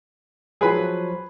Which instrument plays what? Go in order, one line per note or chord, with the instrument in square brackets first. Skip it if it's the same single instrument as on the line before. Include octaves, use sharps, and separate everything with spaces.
[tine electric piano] F3 F#3 [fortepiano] G#4 B4 B5